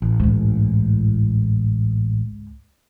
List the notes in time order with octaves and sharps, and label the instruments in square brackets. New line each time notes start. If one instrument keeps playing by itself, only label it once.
[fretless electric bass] A1
[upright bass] C#2 G#2